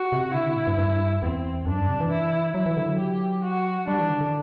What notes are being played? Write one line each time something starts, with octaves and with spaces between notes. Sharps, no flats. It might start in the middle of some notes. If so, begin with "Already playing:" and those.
Already playing: F#4
C3
D3 E4
C3
A2
G2
G2
E2 C4
F#2 D4
G2
C3
E3
E4
F#3 E4
E3
D3
F#3
G4
F#4
G3 D4
E3
D3
D3